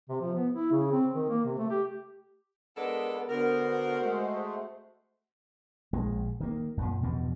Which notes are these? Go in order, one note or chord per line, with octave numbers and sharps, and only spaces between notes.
C3
F3
B3
E4
C#3
C4
D#3
A#3
C3
A3
G4
G#3 B3 D4 A4 A#4
D3 B3 F#4 A#4 C5
G#3 A3
A#1 G#3
D#3 A#3
F#2 A#2
E2 G2 B2 F3